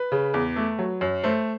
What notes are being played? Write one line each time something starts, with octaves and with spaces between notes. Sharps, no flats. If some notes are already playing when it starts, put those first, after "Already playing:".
Already playing: B4
C#3
E2
A3
F#3
F#2
A3 C5